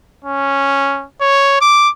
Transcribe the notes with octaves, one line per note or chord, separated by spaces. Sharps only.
C#4
C#5
D6